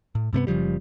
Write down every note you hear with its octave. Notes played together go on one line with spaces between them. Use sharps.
A2
G2 C3 A3 B3
F#1 C#3 F3 G3